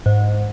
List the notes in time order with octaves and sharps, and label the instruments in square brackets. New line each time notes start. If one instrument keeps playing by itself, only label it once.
[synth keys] G#2